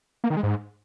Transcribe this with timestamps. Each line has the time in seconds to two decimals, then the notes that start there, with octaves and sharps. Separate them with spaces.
0.24 A#3
0.30 D#3
0.37 G#3
0.43 G#2